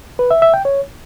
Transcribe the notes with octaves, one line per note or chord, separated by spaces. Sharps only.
B4
E5
E5
G5
C#5